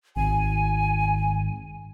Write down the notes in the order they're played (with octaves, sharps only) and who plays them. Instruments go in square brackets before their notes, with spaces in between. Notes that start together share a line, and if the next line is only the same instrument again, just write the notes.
[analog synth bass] G#1 [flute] G#5